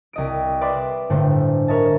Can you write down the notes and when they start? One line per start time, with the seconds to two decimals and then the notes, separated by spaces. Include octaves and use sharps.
0.13 C2 D#5 D7
0.61 B4 D5 E5 B5 C6 D6
1.10 G1 A2 D3 A3 C5
1.68 A#4 C#5 D#5 E5 A5